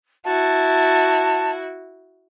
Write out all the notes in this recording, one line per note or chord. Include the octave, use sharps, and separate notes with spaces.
E4 F#4 A5